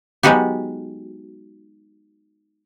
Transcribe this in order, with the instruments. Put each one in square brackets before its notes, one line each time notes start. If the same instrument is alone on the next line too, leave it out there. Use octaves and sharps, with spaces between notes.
[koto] F#3 G#3 B3 D#4 F#4 G4